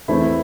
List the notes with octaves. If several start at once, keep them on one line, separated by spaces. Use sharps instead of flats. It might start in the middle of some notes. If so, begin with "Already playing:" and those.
E2 E3 A3 C4 E4